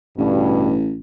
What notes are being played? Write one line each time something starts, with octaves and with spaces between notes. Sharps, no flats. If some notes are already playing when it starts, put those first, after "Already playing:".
A1 G2 B2